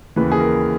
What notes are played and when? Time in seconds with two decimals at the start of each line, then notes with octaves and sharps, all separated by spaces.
0.16 D#2 C#3 E3 B4
0.32 G#4
0.40 A#4